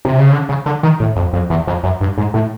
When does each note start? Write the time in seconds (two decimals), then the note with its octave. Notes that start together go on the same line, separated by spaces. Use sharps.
0.05 C3
0.18 C#3
0.32 D3
0.49 C#3
0.66 D3
0.83 D#3
1.00 A2
1.16 F2
1.33 F2
1.50 E2
1.67 F2
1.83 F#2
2.01 G2
2.18 G#2
2.34 A2